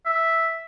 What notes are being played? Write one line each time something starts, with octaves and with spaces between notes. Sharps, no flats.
E5